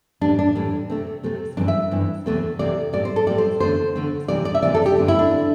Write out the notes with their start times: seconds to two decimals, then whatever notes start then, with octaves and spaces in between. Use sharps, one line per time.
0.21 A2 E3 G3 D4
0.39 D4
0.55 A2 E3 G3
0.90 C3 A3 C4
1.23 C3 A3 C4
1.57 G2 E3 C4 D4
1.68 E5
1.91 G2 E3 C4
2.26 E2 C3 A3 C4
2.59 E2 C3 A3 C4 D5
2.93 A2 G3 C4 D5
3.05 C5
3.16 A4
3.27 A2 G3 C4 D5
3.38 C5
3.60 E2 D3 A3 C4 C5
3.95 E2 D3 A3 C4
4.28 C3 E3 G3 C4 D5
4.45 D5
4.55 E5
4.62 C3 E3 G3 C4 D5
4.74 A4
4.86 G4
4.97 G2 D3 C4
5.08 E4
5.19 D4
5.31 D3 C4